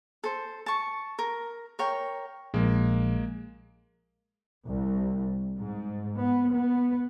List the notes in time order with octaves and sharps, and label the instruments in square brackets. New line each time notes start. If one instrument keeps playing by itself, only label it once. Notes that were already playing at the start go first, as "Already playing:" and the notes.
[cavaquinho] A4 C5
A5 C#6
A#4
A#4 C#5 G5
[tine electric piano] A#1 [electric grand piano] G#3 A#3
[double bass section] C2
G#2
B3
B3